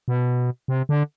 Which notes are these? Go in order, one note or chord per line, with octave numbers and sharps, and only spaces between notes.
B2
C3
D3